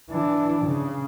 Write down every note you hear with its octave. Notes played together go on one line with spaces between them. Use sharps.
E3 D4
C#3